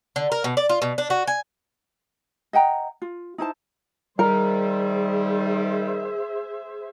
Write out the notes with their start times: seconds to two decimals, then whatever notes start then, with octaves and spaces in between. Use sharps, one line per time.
0.16 D3
0.32 A#4
0.44 B2
0.57 D5
0.69 F4
0.82 B2
0.98 D4
1.10 F#4
1.27 G#5
2.53 D#5 F#5 G5 A#5
3.02 F4
3.38 D#4 E4 C5 A5
4.19 D#3 G3 G#4 A#4 C5 E5